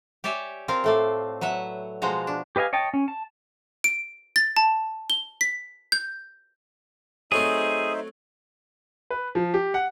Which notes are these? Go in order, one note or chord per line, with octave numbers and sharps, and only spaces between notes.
G4 C#5 D5 E5 G#5
C4 F4 A#4 F5
A2 A3 D5
F#3 B4 E5 F#5
B2 F3 G#3 F#4 A#5
D4
G4 B4 D#5 F5 G#5
C#5 D#5 G5 A5
C#4
A5
D7
A6
A5
G7
B6
G6
F#3 A3 C4 D#4 G#4 C5 E5
B4
F3
G4
F#5